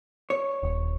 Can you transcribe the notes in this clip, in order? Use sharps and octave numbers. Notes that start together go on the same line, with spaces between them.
C#5
D#1